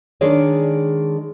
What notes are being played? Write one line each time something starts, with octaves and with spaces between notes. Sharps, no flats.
D#3 G#3 D4 G#4 C#5 D5